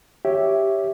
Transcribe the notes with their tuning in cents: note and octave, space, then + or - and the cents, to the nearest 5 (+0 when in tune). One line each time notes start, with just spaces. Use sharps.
G4 +0 C#5 +0 E5 +0